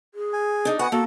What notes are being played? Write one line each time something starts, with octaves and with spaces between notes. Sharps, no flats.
G#4
G#5
D4 D#4
B3 F#4 F#5 G#5
A#3 F#4 A4